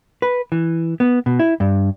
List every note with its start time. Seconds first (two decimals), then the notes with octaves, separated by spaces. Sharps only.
0.22 B4
0.52 E3
1.00 B3
1.26 B2
1.39 E4
1.60 G2